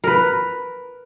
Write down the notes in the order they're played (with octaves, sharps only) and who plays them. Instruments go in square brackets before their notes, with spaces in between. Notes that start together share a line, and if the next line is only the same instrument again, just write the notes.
[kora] A#4 B4